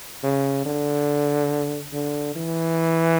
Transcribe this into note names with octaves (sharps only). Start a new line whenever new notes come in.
C#3
D3
D3
E3